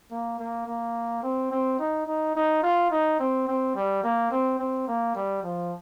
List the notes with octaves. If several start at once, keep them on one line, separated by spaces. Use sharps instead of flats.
A#3
A#3
A#3
C4
C4
D#4
D#4
D#4
F4
D#4
C4
C4
G3
A#3
C4
C4
A#3
G3
F3